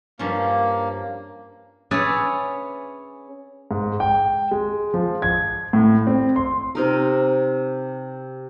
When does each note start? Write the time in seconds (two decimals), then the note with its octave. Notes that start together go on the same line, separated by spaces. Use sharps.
0.19 G2 F3 A#3 C#4
1.91 C#4 G#4 B4 C#5 D5 E5
3.71 G#2
4.00 G5
4.51 G#3
4.94 F3
5.22 G#6
5.73 A2
6.07 C4
6.36 C6
6.75 C3 D#4 A#4